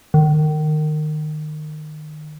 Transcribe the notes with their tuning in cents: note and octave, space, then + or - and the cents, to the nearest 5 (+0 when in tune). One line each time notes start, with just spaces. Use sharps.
D#3 -25